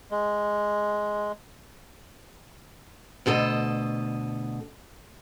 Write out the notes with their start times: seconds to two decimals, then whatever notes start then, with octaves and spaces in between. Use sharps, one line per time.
0.11 G#3
3.26 D2 B2 A4 D#5